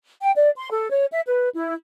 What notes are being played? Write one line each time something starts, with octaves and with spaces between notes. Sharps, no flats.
G5
D5
C6
A4
C#5
E5
B4
E4